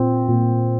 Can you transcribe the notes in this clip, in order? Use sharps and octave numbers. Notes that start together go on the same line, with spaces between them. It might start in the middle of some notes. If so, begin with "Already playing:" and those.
Already playing: A#2 C4
A#2